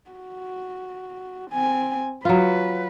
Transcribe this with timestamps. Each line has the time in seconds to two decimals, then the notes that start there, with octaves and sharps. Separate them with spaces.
0.11 F#4
1.51 C4 G#5
2.25 F#3 F4 B4